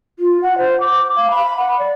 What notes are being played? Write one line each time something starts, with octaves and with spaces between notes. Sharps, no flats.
F4
F#5
C5
D6
F5
B5
F#5
D5